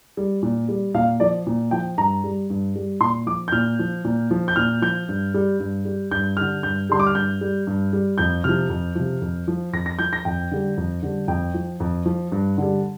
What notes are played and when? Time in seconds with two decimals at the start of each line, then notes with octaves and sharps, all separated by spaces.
0.17 G3
0.43 A#2
0.69 G3
0.94 A#2 F5
1.20 F3 D5
1.47 A#2
1.71 F3 G5
1.98 G2 A#5
2.24 G3
2.50 G2
2.76 G3
3.01 A#2 C6
3.26 F3 D6
3.48 G6
3.52 A#2 F6
3.79 F3
4.05 A#2
4.31 F3
4.48 G6
4.56 A#2 F6
4.82 F3 G6
5.09 G2
5.34 G3
5.60 G2
5.85 G3
6.11 G2 G6
6.37 D3 G3 F6
6.63 G2 G6
6.90 D3 G3 C6
7.00 D6
7.07 F6
7.15 G2 G6
7.41 G3
7.67 G2
7.93 G3
8.18 F2 G6
8.44 C3 F3 F6
8.69 F2
8.95 C3 F3
9.22 F2
9.48 F3
9.73 F2 A#6
9.86 A#6
9.99 F3 G6
10.13 A#6
10.25 F2 G5
10.52 D3 G3
10.77 F2
11.03 D3 G3
11.28 F2 G5
11.54 F3
11.80 F2
12.06 F3
12.32 G2
12.58 D3 G3